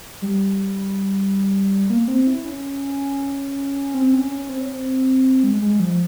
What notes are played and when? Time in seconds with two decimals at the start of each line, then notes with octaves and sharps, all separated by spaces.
0.22 G3
1.90 A#3
2.08 C4
2.27 E4
2.45 C#4
3.94 C4
4.13 C#4
4.31 C#4
4.49 C4
4.61 C#4
4.68 C4
5.44 G#3
5.62 G#3
5.80 F3